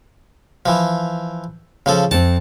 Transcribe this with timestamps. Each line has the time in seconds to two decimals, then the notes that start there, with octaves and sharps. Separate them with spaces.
0.66 E3 F3
1.86 C#3 F3 A4
2.11 F2 C4 A5